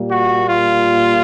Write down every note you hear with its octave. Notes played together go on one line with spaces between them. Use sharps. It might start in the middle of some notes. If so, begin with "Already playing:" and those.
Already playing: A#2 G3 A#3
F#4
F4